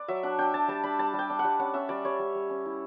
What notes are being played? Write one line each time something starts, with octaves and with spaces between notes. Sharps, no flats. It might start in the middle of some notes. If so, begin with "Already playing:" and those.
Already playing: B4 D5
F#3 E5
D4 F#5
D4 G5
D4 A5
G3 A5
D4 B5
G3 A5
G3
G5
D4
F#5
G3
C#4 F#5
C#4 E5
G3 D5
G3 C#5
G3
G3
C#4
E4